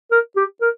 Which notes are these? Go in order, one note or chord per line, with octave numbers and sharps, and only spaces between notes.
A#4
G4
A#4